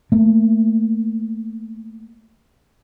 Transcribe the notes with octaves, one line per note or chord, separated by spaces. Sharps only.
A3 A#3